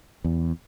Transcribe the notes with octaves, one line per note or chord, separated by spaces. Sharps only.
E2